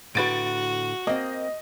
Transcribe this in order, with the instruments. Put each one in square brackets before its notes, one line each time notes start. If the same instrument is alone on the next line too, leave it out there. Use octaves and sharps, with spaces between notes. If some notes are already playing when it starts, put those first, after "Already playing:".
[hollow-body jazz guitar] A2 D3 B4 [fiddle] F#4 [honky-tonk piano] A6 D7
[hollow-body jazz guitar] A#3 C4 [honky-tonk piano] D#5